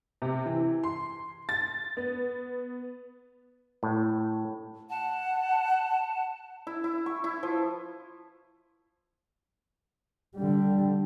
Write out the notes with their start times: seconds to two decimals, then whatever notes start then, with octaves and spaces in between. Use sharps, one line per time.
0.22 C3
0.46 E3
0.84 C6
1.49 A6
1.97 B3
3.83 A2
4.90 F#5 A5
6.67 E4
6.84 E4
7.06 C#6
7.24 E4
7.43 F3
10.36 D3 G3